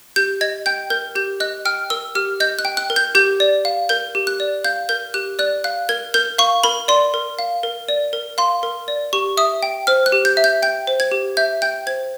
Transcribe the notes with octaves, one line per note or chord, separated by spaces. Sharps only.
G4 G6
D#5 G#6
G5 G6
A#4 G6
G4 G6
D#5 F#6
G5 F6
A#4 E6
G4 F6
D#5 G6
F#6
G5
F#6
A#4
G6
G4 G6
D5
F5
A#4 G6
G4
F#6
D5
F5 G6
A#4 G6
G4 F#6
D5 F#6
F5 F#6
A#4 G#6
A#4 G6
F5 C#6
A#4 B5
D5 C6
A#4
F5
A#4
D5
A#4
F5 C6
A#4
D5
G4 C#6
E5 D#6
G5
C5 F6
F#6
G4
G6
E5
G6
G5 G6
C5
G#6
G4
E5 G6
G5 G6
C5 G#6